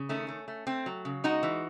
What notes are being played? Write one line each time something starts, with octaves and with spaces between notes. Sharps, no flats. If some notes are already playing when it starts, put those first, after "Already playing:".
Already playing: C#3
D#3 A3 C#4
A3
A3
A3 C4
F#3
C#3
G#3 D#4 F#4
E3